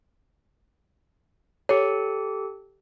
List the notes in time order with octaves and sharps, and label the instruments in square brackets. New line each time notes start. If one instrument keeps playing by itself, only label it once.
[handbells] G4 A4 [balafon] C#5